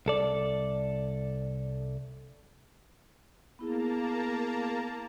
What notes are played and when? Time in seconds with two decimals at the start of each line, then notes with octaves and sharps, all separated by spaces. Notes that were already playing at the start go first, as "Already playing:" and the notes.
0.06 C2 A4 D5
3.59 A#3 B3 E4 G#4 A5 A#5